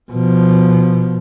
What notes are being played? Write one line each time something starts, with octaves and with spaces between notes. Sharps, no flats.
B2 F3